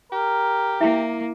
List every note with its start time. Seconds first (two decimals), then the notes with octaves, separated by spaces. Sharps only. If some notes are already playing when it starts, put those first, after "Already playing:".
0.12 G4 A#4
0.81 A#3 E4 E5